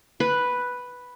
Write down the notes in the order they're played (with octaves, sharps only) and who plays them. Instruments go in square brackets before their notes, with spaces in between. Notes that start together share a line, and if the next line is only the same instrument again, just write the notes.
[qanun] B4